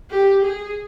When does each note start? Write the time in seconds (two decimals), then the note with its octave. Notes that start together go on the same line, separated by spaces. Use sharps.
0.11 G4
0.45 G#4